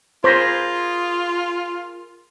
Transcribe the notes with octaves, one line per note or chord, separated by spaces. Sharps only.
F4 G#4 A#4 C5 B5